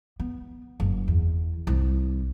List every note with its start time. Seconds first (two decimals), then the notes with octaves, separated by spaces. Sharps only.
0.20 B3
0.80 F#1
1.08 E2
1.67 C2